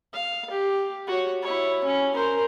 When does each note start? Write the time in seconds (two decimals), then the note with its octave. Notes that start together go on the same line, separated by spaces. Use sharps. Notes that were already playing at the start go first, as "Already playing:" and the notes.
0.13 F5
0.50 G4
1.07 F#4 C#5
1.42 E4 C#5
1.84 C#4
2.15 A#4 C5